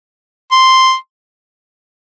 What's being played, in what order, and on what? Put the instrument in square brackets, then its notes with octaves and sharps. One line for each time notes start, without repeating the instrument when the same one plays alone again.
[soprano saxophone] C6